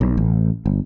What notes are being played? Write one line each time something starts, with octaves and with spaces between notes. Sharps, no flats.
B1
A1
G1